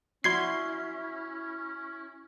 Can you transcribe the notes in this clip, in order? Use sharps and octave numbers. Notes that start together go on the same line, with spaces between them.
F3 C#4 E4 F#4 D5 C6 G#6 C7